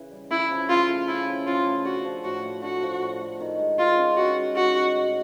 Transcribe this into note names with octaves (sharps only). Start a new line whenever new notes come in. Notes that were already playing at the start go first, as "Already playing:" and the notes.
Already playing: C#3 E3
G3
C#4 E4
F3
C#3 F4
A3
C#4 E4
F3
C#3 F4
A3
D4 F#4
F3
A2 F#4
A3
D4 F#4
F3
A2
A3
D#3
G#3
D#3 F4
C#4
D#3 F#4
G#3
D#3 F#4
C#4
A2